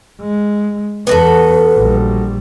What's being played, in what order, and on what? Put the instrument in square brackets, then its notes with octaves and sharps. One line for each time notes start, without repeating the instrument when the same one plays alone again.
[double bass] G#3
[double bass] E2 [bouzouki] B3 F#4 A4 [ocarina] B4
[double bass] A#1 G3